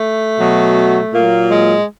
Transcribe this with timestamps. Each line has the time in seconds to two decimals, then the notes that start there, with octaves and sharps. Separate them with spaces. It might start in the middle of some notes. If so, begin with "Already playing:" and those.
Already playing: A3
0.39 B2 F#3
1.13 A#2 F#3 A#3
1.51 G#3